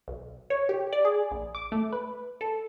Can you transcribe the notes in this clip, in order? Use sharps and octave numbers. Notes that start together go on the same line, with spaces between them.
B1
C#5
G4
D5
G#4
A#1
D6
A3
B4
A4